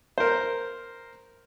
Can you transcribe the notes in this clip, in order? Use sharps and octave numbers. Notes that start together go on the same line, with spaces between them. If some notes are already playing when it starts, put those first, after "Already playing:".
A#4 C5